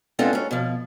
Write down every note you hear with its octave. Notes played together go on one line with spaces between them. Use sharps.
G#3 B3 C4 D4 F4 A4
G#2 C#4
B2 F3